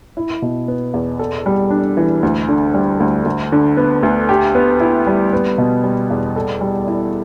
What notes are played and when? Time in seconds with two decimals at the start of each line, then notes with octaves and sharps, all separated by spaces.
0.17 E4
0.42 B2
0.68 B3
0.94 E2
1.19 A4
1.46 G3
1.70 D4
1.97 E3
2.23 D2
2.49 D3
2.74 G3
3.00 D2
3.25 D2
3.52 D3
3.77 B3
4.03 D2
4.29 G4
4.55 B3
4.80 E4
5.07 G3
5.33 B3
5.58 B2
5.83 G3
6.10 E2
6.36 A4
6.61 G3
6.87 E4